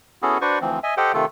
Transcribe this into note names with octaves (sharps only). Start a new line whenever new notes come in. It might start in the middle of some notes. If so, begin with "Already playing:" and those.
B3 C#4 E4 F#4 G#4 A4
D4 F#4 B4 C5 D5 C#6
D2 E3 F3 C4
D#5 E5 G#5
G4 A4 C5 D#5 F#5 G5
C3 D#3 A3 F4 A4